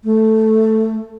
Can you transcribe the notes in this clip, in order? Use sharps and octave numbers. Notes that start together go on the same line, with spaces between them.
A3